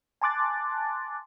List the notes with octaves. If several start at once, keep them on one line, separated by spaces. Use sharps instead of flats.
G#5 A5 C6 D6 F#6 A6